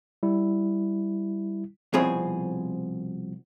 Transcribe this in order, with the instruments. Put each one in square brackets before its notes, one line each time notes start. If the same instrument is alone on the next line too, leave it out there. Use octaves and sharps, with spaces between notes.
[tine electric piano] G3 E4
[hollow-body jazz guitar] C2 B2 F3 C4 G#4 C#5